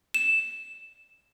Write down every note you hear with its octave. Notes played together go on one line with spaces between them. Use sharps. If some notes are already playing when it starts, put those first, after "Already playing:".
E7